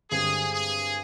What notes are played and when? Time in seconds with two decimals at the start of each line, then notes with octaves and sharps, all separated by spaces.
0.11 G2 D3 G#3 C4 G#4
0.53 G#4